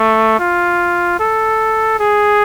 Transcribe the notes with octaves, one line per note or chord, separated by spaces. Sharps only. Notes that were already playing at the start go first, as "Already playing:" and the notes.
Already playing: A3
F4
A4
G#4